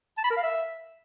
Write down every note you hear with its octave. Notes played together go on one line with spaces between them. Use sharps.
A5
B5
A#4
F5
E5